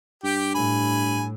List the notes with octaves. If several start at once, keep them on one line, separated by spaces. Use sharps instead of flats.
G2 G4 G5
A2 G#5 B5